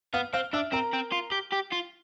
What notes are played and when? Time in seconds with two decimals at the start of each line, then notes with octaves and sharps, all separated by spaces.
0.14 B3 F5 F6
0.33 C4 F5 F6
0.53 D4 E5 E6
0.72 C4 A#4 A#5
0.93 C4
1.12 F4
1.32 G4
1.53 G4
1.72 F4